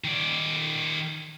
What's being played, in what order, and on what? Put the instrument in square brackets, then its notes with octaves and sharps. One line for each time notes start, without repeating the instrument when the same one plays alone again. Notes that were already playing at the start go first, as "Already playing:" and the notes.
[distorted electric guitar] D#3 D5